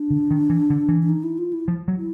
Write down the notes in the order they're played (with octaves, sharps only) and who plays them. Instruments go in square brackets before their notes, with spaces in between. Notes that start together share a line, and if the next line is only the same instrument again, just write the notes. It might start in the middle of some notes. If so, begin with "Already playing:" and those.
Already playing: [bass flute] D4
[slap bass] D3
D#3
E3
D3
E3
[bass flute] D4
D#4
E4
F4
E4
[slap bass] F3
F#3
[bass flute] E4